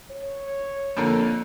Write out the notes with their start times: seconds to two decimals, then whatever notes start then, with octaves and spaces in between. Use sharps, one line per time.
0.11 C#5
0.97 F2 D3 A#3